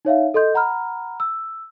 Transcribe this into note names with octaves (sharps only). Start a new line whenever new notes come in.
D#4 C#5 E5 F5
A4 D#5 C6 G6
F#5 A#5 B5 F6
E6